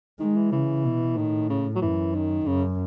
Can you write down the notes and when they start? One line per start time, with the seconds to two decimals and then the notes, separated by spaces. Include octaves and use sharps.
0.19 D#3 G#3
0.36 E3
0.52 C#3 E3
0.84 B2
1.17 A2 D#3
1.50 C#3
1.76 F#3
1.82 F#2 E3
2.15 D#3
2.46 F#2 C#3